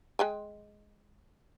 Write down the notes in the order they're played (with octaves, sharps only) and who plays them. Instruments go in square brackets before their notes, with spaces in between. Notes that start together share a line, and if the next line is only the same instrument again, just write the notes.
[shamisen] G#3 G5 G#5